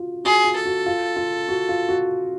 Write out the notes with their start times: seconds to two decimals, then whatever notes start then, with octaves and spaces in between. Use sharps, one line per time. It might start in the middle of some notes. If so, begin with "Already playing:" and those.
Already playing: F4 F#4
0.24 F#4 G#4
0.45 F4
0.55 A4
0.66 F#4
0.86 F4
1.16 F4
1.48 F#4
1.69 F4
1.89 F#4